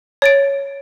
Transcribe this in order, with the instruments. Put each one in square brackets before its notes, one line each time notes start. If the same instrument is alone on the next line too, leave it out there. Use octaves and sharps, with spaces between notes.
[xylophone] C#5 A6 D7